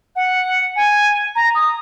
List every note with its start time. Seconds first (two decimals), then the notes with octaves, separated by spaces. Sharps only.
0.16 F#5
0.76 G#5
1.36 A#5
1.55 D#6